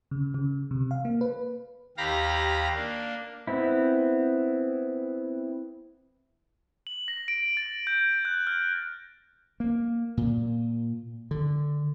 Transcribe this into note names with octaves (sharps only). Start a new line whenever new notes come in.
C#3
C#3
C3
F5
A#3
B4
D#2 G4 F5 A#5 B5 A#6
A#3 D4
B3 C4 E4
F#7
A#6
D7
A6
G6
F#6
F6
A#3
A#2
D3